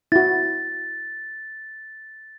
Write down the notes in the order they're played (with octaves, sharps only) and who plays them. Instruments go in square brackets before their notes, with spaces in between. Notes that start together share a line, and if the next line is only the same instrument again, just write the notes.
[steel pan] E4 F#4 [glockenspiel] A6